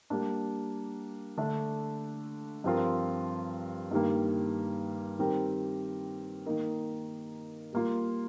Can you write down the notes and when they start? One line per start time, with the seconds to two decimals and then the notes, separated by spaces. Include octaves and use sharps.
0.10 G3 A#3 D4
1.37 D3 A3 D4
2.64 G2 F3 C4 F4 A#4
3.91 G2 D#3 G3 A#3
5.19 D#3 G3 C4 G4 A#4
6.46 D#3 A#3 D#4 A#4
7.73 G3 A#3 F4